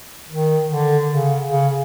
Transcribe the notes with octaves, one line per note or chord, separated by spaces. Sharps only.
D#3
D3
C#3
C#3